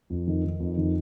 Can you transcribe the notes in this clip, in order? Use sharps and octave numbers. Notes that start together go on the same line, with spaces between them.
F2
D#3
D#3
F2
D#3